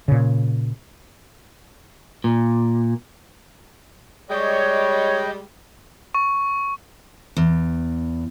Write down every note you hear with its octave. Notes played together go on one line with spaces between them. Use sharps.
A#2 C#3
A#2
G3 G#3 C#5 D#5 G5
C#6
E2